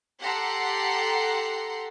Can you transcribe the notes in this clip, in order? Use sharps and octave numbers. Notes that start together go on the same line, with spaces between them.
G4 A4 F#5 A#5 C6